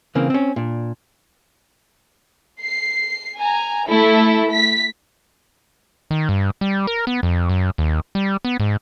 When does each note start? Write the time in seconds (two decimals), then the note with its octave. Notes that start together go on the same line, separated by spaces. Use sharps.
0.15 C#3 E3 A#3 C4
0.30 C4 C#4
0.56 A#2 D4
2.62 C7
3.37 G#5 A#5
3.88 A3 E4 A4
4.52 B6
6.11 D#3
6.29 G2
6.61 G3
6.87 A#4
7.07 B3
7.23 F2
7.49 F#2
7.78 D#2
8.15 G3
8.45 B3
8.60 G#2